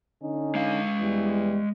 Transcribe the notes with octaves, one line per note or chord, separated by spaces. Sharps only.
D3 C#4 D#4
G#3 F5
E2 E3 G3